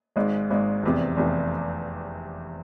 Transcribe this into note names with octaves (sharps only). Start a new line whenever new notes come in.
G#1 G#2 G#3
G#1 G#2 G#3
F1 E2 C3
F1 E2 C3